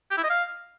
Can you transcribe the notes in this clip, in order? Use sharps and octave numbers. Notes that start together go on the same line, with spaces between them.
G4
E4
D#5
F5